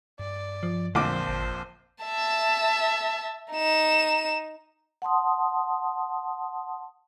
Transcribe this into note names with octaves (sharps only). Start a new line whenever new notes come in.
G2 D5
F3
A#1 F2 D3 F3 C5 D6
G#1
E5 A5
D#4 E7
F#5 A5 C6 D#6